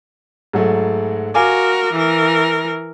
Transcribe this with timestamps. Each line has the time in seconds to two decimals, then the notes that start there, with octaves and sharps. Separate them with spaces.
0.53 G#2 F#3 A3
1.35 F#4 A#4 F5 G#5 D6
1.93 E3 A#4